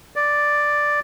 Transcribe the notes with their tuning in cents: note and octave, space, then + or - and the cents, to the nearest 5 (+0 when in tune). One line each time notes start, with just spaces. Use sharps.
D5 +0